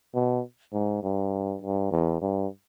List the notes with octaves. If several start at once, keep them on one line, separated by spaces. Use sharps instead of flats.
B2
G#2
G2
G2
E2
G2